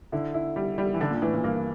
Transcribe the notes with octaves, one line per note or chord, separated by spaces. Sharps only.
D3 E4
E4
G3
G3
E3
D3 D4
A#2
A2 E3
A#2
G2 A#3